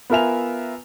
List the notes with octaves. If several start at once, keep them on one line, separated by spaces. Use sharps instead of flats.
B3 F4 A#4 E5 G#5 F7